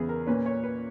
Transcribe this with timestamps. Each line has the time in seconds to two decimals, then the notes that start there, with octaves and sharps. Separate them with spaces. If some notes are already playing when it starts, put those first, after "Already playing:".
Already playing: E2 C#3 E3 B3 G#4
0.09 A#4
0.27 A#2 A#3 C#4 B4
0.46 C#5
0.64 B4